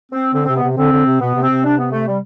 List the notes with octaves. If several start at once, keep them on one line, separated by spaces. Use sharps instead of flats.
C4
D3 C4
C3 C4
B3
C3
D3 C4
D3
C3
B2 B3
C3
C4
C3
D4
B3
A3
G3